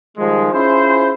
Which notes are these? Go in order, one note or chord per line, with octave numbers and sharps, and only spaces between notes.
D#3 F3 G3 G#3
C#4 E4 F4 G#4 C5